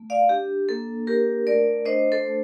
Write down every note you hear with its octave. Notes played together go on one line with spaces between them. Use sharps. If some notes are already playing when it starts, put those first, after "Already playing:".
Already playing: A3
D5 F5
D4 G4
A#3 A4
D4 G4 A#4
A3 A#4 D5
D4 C5 D#5
A4 C5
A3